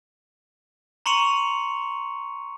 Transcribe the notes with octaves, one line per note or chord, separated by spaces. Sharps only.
A#5 C6 C#6 C#7 D#7 F7